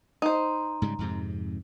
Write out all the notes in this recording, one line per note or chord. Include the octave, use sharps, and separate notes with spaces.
D#4 C5
G#2 C#3 G3
F2 G#2 C3